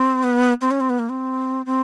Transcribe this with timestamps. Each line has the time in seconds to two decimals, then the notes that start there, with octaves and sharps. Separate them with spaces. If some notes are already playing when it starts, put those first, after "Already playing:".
Already playing: C4
0.23 B3
0.61 C4
0.71 C#4
0.80 C4
0.90 B3
0.99 A#3
1.09 C4
1.66 C4